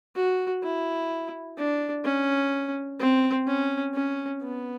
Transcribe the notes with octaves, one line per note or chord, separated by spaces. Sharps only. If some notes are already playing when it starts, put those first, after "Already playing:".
F#4
E4
D4
C#4
C4
C#4
C#4
B3